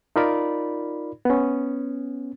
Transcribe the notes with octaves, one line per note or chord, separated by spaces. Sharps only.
D#4 F4 A#4 D5 B5
B3 C#4